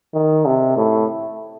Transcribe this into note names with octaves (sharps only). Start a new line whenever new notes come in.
D#3
C3
A2